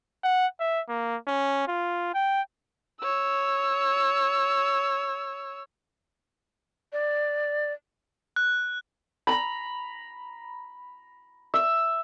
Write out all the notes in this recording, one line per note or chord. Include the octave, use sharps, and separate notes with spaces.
F#5
E5
A#3
C#4
F4
G5
C#5 E6
D5
F#6
A#5 B5
E5